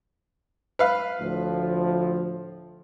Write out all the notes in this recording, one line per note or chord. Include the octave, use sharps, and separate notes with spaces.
B4 F5
D2 A2 F3